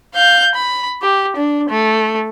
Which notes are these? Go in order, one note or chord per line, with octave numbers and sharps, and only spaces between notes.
F5 G6
B5
G4
D4
A3